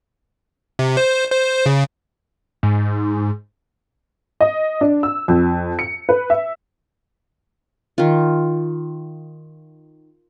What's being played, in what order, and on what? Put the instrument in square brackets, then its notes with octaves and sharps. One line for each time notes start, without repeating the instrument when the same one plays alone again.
[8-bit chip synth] C3
C5
C5
C#3
[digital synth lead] G#2
[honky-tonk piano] D#5
D4
E6
F2
C#7
B4
E5
[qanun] D#3 F4